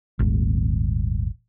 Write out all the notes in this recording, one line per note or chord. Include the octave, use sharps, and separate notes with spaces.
D#1 G#1